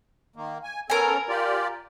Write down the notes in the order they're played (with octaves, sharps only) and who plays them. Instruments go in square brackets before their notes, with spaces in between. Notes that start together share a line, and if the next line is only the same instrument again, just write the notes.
[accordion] D#3 A#3
G#5
[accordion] B3 C#4 A4 [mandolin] A#4 G#5
[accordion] F4 G4 D5